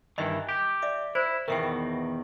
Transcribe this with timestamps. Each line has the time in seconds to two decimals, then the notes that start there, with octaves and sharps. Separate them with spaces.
0.18 G2 D#3 E3 D#5
0.49 G4
0.82 D5 E5 D6
1.15 E4 C5
1.48 E2 B2 D#3 A#4 E5 G5